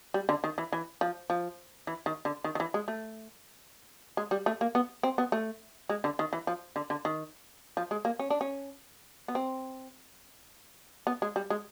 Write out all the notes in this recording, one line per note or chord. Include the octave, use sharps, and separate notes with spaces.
G3
D3
D#3
E3
E3
F3
F3
E3
D#3
D3
D#3
D#3
E3
G#3
A3
G#3
G3
A3
A#3
B3
C4
B3
A3
G#3
D3
D#3
E3
F3
D3
D3
D#3
F3
G#3
A#3
C#4
D4
C#4
B3
C4
B3
G#3
G3
G#3